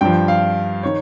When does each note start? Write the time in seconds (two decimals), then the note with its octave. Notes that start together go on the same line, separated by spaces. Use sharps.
0.01 G2 F3 G5
0.28 F5
0.83 D#3 C#5